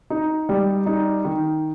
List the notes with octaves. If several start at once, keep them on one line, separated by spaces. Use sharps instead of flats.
D#4
G3
D#4
D#3